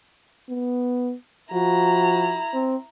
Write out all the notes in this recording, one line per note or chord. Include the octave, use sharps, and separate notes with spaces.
B3
F3 E4 F#4 A#5
C4